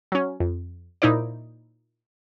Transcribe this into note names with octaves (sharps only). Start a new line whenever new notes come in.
F#3 C#4
F2
A#2 D#4 E4 C5 D5